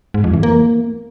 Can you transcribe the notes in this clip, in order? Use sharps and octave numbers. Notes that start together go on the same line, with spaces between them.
G#2
F2
E3
A#3